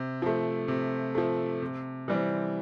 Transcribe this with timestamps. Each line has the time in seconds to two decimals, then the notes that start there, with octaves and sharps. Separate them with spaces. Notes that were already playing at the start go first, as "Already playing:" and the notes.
Already playing: C3
0.22 F3 A3
0.68 C3
1.15 F3 A3
1.62 C3
2.08 E3 G3 C4